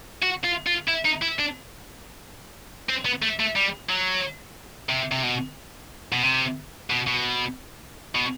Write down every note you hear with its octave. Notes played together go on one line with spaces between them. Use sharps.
F#4
F4
F4
E4
D#4
E4
D4
C4
B3
A3
A3
G3
F#3
C3
C3
B2
B2
C3
B2
B2
B2